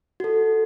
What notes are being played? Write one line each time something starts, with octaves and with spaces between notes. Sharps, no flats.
F#4 A4